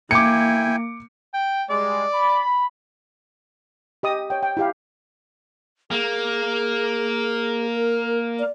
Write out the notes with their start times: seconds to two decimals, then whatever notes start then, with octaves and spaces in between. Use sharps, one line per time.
0.11 A#3 E4 G5 G#5 D6 C#7
1.34 G5
1.70 G3 G#3 D5
2.14 B5
4.03 G4 D#5 D#6
4.30 C#5 G5
4.43 G5
4.57 E4 G4 F5
5.91 A#3 G#4
7.75 A#4
8.39 D5